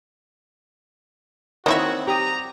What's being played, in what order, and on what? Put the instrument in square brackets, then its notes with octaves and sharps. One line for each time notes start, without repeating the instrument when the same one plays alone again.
[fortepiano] D#3 C4 [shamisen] A#3 E4 E5 [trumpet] F#4 [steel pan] C#5 D#5
[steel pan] G4 D#6 [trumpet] A#5